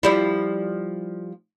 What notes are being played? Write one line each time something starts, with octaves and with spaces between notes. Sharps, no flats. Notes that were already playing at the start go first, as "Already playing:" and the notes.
F3 G3 E4